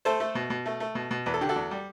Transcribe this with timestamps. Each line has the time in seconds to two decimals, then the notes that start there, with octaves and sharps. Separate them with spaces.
0.05 A3 A4 C5
0.20 A3
0.35 B2
0.50 B2
0.66 A3
0.80 A3
0.95 B2
1.11 B2
1.26 E2 B4
1.34 A4
1.41 D3 G4
1.49 F#4 A4
1.56 E2
1.71 G3